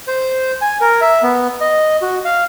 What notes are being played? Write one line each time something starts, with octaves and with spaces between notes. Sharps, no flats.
C5
G#5
A#4
E5
B3
D#5
F#4
F5